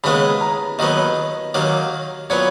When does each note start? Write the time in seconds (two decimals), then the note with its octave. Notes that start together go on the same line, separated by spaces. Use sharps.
0.04 D#2 C#3 G#3 B3 B5
0.41 A#5
0.79 D#2 D#3 F#3 B3 D#5
1.54 D#2 D#3 F#3 A#3
2.30 A#2 F#3 B3 C#5